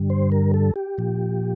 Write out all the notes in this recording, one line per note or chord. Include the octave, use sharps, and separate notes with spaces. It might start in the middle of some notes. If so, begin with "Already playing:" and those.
Already playing: G2 D3 G3
C5
A#4
A4
G4
A#2 F3